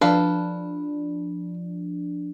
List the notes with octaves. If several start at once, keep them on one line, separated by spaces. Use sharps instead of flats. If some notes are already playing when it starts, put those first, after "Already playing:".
F3 D4 A4 B4 F5